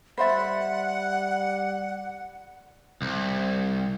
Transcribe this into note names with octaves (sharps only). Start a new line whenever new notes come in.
G3 C5 E5 F#5 B5 C6 A6
C2